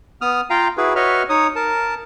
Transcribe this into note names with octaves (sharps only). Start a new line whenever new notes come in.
B3 D#6 F6
F4 F5 G5 A#5
E4 F#4 G#4 B4
F#4 B4 C#5 D#5 E5 F6
D#4 C#5 D#6
A#4 A5